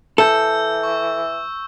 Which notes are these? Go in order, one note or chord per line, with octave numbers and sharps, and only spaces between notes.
E3 A4 E6 G6
C#6